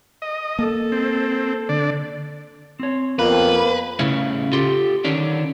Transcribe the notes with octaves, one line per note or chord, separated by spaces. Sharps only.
D#5
A#3 A4
C4
D3 D5
C4 C#5
F2 A#3 B3 B4
A2 C#3 C#4 E4
F4 G4 A4 C6
D3 D#3 C#4 D4